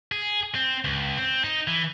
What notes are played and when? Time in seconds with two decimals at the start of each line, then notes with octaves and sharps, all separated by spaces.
0.12 G#4
0.55 C4
0.84 C#2
1.17 C4
1.44 D#4
1.67 E3